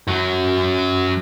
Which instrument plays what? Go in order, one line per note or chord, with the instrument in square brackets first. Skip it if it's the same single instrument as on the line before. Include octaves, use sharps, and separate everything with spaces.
[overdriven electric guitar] F#2 F#3